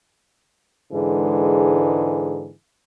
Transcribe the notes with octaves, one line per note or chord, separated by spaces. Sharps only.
G#2 D3 E3 G#3